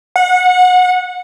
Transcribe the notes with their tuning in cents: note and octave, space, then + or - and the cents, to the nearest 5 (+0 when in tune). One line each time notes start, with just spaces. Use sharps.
F#5 -25